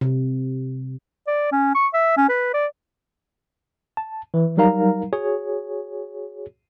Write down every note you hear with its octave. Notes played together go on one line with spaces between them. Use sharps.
C3
D5
C#4
C#6
E5
C#4
B4
D5
A5
E3
F#3 G3 D#4 A#4 F5 A#5
F#4 G#4 C#5